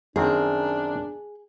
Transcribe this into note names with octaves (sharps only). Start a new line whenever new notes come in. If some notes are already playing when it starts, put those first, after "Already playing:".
F#2 D#3 C4 D4 G#4